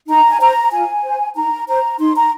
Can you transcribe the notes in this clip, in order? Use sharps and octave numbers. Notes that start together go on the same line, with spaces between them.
D#4 A#5
G#5
C5 A#5
F4 G#5
C5
D#4 A#5
C5 A#5
D#4 C6
A#5